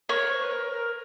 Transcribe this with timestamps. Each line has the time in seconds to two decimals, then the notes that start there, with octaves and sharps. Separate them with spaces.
0.09 A#4 C#5
0.30 C5
0.43 B4
0.51 A#4
0.72 A#4